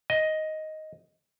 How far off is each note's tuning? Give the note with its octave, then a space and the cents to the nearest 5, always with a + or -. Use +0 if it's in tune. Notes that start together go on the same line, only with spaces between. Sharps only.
D#5 +5